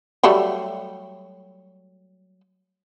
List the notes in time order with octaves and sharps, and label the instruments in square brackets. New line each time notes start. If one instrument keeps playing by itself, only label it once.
[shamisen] F#3 G3 A3